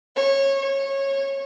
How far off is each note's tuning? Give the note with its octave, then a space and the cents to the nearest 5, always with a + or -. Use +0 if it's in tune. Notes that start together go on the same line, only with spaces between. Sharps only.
C#5 -20
C#5 -20